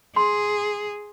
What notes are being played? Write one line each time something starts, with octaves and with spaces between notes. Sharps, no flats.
G#4 C6